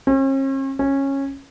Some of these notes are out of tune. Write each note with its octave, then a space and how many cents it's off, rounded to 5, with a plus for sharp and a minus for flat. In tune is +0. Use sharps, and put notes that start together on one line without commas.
C#4 -45
C#4 -15